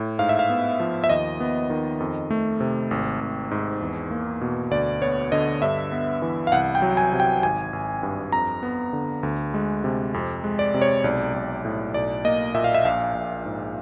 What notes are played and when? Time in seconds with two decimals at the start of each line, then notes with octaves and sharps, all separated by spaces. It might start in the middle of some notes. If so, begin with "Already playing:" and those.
Already playing: A2
0.19 G#2 F5
0.29 E5
0.39 F5
0.49 B3
0.80 F3
1.04 E5
1.09 D#2 D#5
1.40 B3
1.70 D#3
2.00 F2
2.31 A3
2.60 C3
2.91 G#1
3.21 G#1
3.51 G#2
3.81 E2
4.11 A#3
4.41 B2
4.71 D2 D5
5.02 B3 C#5
5.32 D3 D#5
5.62 G2 E5
5.92 B3
6.22 E3
6.47 F5
6.52 C2 F#5
6.75 G5
6.82 F#3
6.97 G#5
7.13 C3
7.20 G5
7.43 G#1 G#5
7.73 G#1
8.03 G2
8.32 F2 A#5
8.63 B3
8.93 D3
9.23 D2
9.54 G#3
9.84 C3
10.14 F2
10.44 G#3
10.59 D5
10.74 C3
10.82 C#5
11.04 B1 D5
11.34 B1
11.65 A2
11.94 B1 D5
12.25 A#3 D#5
12.54 A#2 E5
12.64 F5
12.75 E5
12.85 A#1 F5
13.15 A#1
13.45 G#2